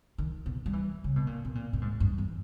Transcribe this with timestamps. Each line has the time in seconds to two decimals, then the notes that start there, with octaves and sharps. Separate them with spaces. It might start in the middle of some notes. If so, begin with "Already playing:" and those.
0.18 D#3
0.46 B2
0.66 G3
0.73 E3
1.04 C#3
1.16 B2
1.27 A#2
1.45 B2
1.55 A#2
1.73 A#2
1.81 G#2
2.00 G2
2.18 E2